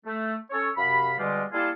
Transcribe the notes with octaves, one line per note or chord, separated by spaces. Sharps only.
A3
C#4 A4 C#5
F#2 C3 F5 B5
B2 D3 G3 G#3 F4 G4
G3 A#3 E4 F4 G#4 A4